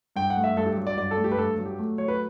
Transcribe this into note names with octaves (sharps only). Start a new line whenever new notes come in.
G2 G5
F#5
A3
E5
G2 A4
G4
F#3
D5
G2 D5
A4
A3
G4
B4
G2 A4
F#3
G4
A3
F#3 C#5
B4